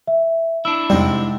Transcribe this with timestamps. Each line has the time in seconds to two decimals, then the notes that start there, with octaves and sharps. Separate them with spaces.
0.07 E5
0.65 D4 E4 E6
0.90 F2 G#2 C3 G3 C4